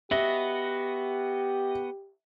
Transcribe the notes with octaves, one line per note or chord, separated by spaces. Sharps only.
B3 F#4 G4 D#5 E5